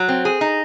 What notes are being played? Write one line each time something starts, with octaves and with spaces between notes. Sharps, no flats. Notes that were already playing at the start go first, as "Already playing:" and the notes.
Already playing: F#3
C4
G#4
D#4